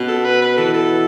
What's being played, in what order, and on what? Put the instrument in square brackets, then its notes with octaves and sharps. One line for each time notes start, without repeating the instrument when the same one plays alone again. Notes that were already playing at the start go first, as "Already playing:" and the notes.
Already playing: [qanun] B2 B3 C#4
[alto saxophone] A4
B4
B4
[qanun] E3 [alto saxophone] A4
[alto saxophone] A4